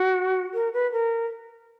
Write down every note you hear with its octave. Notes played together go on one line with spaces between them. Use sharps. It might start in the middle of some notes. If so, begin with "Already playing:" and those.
Already playing: F#4
A#4
B4
A#4